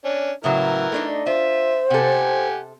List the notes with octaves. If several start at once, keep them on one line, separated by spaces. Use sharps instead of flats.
C#4 D4
A2 C#3 E3 F#3 A#4 E5
A3 D4 D#4
F4 C5 E5
C3 G4 A4 F#5 G#5